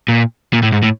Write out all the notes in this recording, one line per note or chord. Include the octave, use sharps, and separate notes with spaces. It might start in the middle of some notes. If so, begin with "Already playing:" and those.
A#2
A#2
A2
G#2
A2